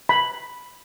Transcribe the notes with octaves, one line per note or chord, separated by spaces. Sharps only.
B5